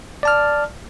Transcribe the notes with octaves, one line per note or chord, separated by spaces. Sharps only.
D5 A5 F6